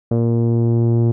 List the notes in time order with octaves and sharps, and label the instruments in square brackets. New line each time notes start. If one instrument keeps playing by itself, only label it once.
[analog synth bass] A#2